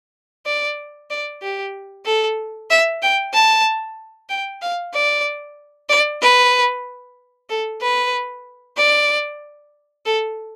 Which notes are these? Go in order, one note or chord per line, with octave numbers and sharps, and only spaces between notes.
D5
D5
G4
A4
E5
G5
A5
G5
F5
D5
D5
B4
A4
B4
D5
A4